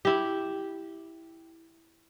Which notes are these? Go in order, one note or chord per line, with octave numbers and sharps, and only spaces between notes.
E4 G4